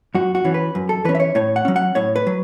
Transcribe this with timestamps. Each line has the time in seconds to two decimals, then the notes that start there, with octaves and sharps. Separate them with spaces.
0.15 F#2 F#4
0.35 F#4
0.45 E3 C#4
0.54 B4
0.75 F#2
0.89 A4
1.05 E3 C#4 B4
1.15 E5
1.20 C#5
1.35 A2 C#5
1.56 F#5
1.65 F#3 C#4
1.76 F#5
1.95 A2 C#5
2.16 B4
2.27 F#3